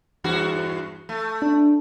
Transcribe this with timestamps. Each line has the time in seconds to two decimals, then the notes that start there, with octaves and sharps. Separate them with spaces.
0.24 E2 G2 F#4
1.09 A3
1.42 D4